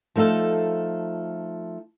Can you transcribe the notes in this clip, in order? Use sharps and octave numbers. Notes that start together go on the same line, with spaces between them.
F3 A3 D#4 F4 A4